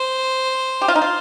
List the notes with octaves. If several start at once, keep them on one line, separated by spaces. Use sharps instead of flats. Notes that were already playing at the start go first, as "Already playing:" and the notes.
Already playing: C5
G4
F4
D#4
F4